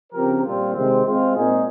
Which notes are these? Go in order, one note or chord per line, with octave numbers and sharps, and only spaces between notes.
C#3 F3 C4 G4 A#4
A#2 G3 C4 F4
C3 D#3 G#3 C4
G#3 C4 F4
A#2 G#3 C4 D#4 G#4